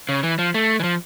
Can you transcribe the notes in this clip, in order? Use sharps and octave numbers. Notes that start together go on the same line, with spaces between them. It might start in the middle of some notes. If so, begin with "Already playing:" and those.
C#3
E3
F3
A3
E3
F3